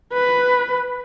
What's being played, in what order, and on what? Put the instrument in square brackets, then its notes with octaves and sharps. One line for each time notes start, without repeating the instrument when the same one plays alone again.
[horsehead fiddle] B4